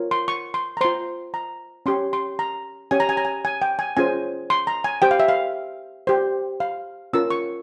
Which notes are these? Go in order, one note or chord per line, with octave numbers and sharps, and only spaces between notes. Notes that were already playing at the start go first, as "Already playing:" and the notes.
Already playing: F4 A#4 C#5
C6
C#6
C6
A#5
F4 C5 C6
A#5
C#4 G4 C#5 C6
C6
A#5
C#4 G4 C#5 G#5
A#5
G#5
A#5
G#5
G#5
G5
G#5
C#4 F4 G#4 C5 G#5
C6
A#5
G#5
G4 C5 G5
F5
E5
F5
G4 C5
F5
C#4 F4 A#4 E6
C#6